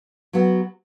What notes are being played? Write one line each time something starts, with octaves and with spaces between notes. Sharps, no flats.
F#3 B3 F#4